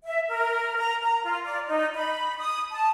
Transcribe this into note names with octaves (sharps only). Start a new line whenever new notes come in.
E5
A#4
A#5
A#5
F4
D5
D#4
B5
D#6
A5